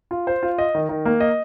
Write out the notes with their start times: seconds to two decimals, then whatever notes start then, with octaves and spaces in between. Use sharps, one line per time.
0.11 F4
0.27 C5
0.43 F4
0.58 D#5
0.75 D#3
0.89 D#3
1.05 A#3
1.20 D#5